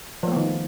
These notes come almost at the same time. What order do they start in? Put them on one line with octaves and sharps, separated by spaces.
F3 A3 B3 D#3